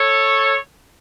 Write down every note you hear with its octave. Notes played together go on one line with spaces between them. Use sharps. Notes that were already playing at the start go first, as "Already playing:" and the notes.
Already playing: A4 C#5